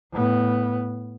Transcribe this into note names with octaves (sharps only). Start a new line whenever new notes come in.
A2 B3